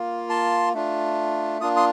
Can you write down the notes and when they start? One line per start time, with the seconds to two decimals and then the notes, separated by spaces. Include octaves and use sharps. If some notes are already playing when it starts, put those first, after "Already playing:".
Already playing: A#3 F4
0.29 A5 C6
0.74 A3 D4 F4
1.61 A#3 D4 F4 D#6
1.77 C6 D#6